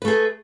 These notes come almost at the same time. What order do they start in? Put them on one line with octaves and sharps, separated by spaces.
B4 A3 G#4